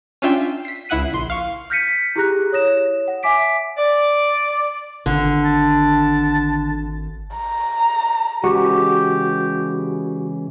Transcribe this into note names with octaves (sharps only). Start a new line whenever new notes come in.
C#4 D4 F4 E5 G5 C6
B6 C7
C#2 E4 E5 F#5 F#6 D#7
A#1 C6
F5 C#6
F6 G6 A#6 B6 C#7 D#7
E4 G4 G#4 A#5 F#6 A#6
C#5 D#6 A#6 E7
F#5
E5 G#5 D6 B6 D7
D5
G#1 D3
A5
A#5
C#3 E3 G#3 F#4 G4 C#6